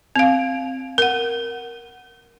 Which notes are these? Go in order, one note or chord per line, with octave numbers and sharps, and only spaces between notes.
C4 F5
A#4 F#5